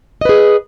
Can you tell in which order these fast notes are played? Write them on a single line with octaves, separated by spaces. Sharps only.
D#5 B4 G#4